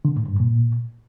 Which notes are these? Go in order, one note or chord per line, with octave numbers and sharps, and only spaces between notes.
D3
A2
G2
A#2